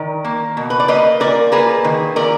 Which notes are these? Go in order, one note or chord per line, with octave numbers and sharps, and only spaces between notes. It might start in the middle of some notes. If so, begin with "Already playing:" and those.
Already playing: D#3 A#4 D5
A#3
B2
B4
D5
A#3 B4 D#5
A#2 A#4 D5
A#3 G#4 B4
D#3
A#2 A#4 D5